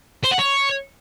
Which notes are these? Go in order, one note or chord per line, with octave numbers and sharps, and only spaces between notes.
C5
F#5
C#5